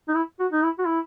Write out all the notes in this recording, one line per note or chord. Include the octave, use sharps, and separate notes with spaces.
D#4
E4
F#4
D#4
E4
F#4
E4